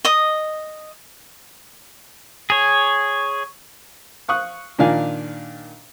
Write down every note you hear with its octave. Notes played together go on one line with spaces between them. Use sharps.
D#5 D#6
G#4 C#5
F5 C#6 D#6 F#6
A#2 D#3 D4 F5 G#5